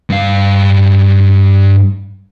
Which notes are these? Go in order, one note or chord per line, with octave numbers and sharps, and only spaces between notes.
G2 F5